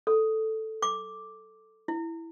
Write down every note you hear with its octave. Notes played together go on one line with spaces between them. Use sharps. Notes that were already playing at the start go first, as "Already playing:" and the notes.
A4
D6
E4